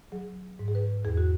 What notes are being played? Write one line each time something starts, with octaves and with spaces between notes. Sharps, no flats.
F#3 G#4
G#2
G#4
B4
E2 G#4
F#4